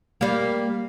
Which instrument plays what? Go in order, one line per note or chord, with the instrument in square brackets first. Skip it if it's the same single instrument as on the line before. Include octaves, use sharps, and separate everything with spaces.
[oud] G3 A#3